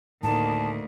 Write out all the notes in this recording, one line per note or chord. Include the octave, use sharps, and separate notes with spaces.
D2 A2 D#3 A#3 A5